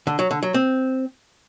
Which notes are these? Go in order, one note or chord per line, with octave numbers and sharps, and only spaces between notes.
D3
F#3
D3
F#3
C4